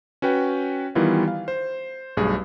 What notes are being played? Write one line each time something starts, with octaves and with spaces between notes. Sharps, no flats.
C#4 F#4 B4 G5
D#3 E3 G3 B3 E4 F4
F5
C5
B1 G2 A3 G#4